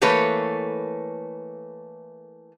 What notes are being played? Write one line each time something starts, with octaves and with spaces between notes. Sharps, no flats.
E3 A3 A#3 A4 B4 C#5